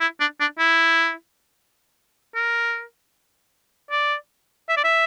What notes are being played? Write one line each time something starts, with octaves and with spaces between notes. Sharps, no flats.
E4
D4
D4
E4
A#4
D5
E5
D5
E5